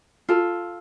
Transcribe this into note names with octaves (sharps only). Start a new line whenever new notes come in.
F4 A4